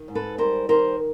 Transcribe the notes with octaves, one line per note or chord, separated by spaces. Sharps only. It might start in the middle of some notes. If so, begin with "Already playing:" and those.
Already playing: D#3
G#2
A4 B4
G3 A#4 C5
D#3 A#4 C5